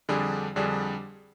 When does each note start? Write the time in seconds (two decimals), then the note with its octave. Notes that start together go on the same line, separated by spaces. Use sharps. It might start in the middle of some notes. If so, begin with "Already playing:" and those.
0.09 F2 D3 G3 D4 G#4
0.56 F2 D3 G3 D4 G#4